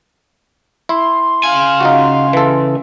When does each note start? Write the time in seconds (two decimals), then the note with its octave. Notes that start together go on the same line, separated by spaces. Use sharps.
0.89 E4 C6
1.43 C#3 F5 G#5
1.81 D#4 F4 F#4
2.33 E3 A4